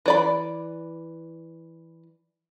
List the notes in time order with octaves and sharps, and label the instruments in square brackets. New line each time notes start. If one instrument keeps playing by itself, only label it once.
[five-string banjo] E3 D5 B5